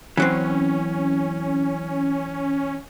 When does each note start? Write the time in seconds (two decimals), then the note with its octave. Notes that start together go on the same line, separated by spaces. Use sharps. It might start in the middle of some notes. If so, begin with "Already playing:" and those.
0.17 E3 F#3 C4 C#4